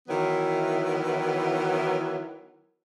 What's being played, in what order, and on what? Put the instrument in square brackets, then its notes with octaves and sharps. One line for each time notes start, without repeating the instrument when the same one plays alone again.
[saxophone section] D#3 E3 F#3 B3 E4